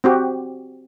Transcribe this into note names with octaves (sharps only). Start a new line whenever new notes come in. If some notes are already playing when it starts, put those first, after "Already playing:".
C4 F#4 G4